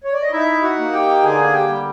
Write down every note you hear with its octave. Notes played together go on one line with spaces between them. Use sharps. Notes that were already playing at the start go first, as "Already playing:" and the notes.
C#5
D5
D#5
D#4 E4 E5
F#4 F#5
A#3
G4 G5
D3 G#4 G#5
G4 G5
G3